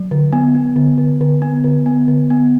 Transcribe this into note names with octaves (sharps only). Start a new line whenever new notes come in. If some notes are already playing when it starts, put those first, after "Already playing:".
Already playing: F#3
D3
B3
B3
D3
D3
D3
B3
D3
B3
D3
B3